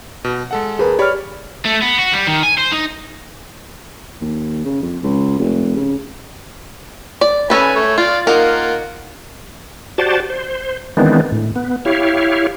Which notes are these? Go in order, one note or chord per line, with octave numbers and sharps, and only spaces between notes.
B2
G#3 A4 F#5
D#2 G#4 A#4 B4
G4 C#5 D5 B5 F6
A3
B3
F#4
G3
D#3
G#5
C5
D#4
D#2
C#3
F2
C#2
F1
C#3
D5
C#4 A4 B4 G#5 B5
A3 C#5
F4 D5 F5
A#3 D#4 F4 A#4 F#5
F#4 G4 C5 D5 A5
C5
D#3 E3 G#3 B3 C4 D4
A2
B3
E4 G4 C#5 F5